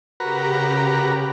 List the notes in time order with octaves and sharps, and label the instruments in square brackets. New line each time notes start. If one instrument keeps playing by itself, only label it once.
[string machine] C#3 G4 A#5 [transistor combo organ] F#4 A#4 B4